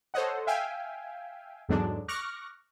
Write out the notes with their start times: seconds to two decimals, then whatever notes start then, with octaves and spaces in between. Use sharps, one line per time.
0.14 A4 C5 C#5 D#5 F#5
0.47 E5 F5 G5 G#5
1.69 E2 G#2 D3 F#3 G#3 D4
2.08 C#6 D6 F6 F#6 A#6